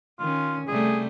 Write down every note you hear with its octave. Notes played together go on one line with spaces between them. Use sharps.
D#3 C#4 F4
C3 G3 A3 G#4